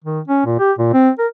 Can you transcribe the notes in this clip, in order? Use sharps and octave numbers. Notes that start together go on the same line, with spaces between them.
D#3
C#4
A#2
G4
A#2
C4
A#4